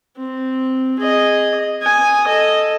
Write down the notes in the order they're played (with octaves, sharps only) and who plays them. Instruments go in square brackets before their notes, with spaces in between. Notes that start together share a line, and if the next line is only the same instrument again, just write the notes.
[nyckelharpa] C4
G#4 D#5
G#5 D#6
A4 D#5